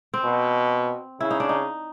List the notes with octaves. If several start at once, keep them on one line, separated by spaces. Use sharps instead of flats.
C4
B2
C#3 E4
D#4
D4
D#4